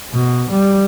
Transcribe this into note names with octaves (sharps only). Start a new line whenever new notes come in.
B2
G3